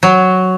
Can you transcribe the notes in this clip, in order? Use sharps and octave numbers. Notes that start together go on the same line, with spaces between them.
F#3